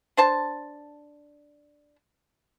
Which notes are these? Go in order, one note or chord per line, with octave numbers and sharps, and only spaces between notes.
D4 C5 A5